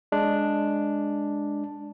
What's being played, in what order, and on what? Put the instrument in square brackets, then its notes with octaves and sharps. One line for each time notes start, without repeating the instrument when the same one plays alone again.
[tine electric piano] G#3 D4